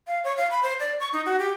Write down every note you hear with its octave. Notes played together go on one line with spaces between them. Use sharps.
F5
C#5
F5
B5
C5
D5
C#6
D#4
F#4
G4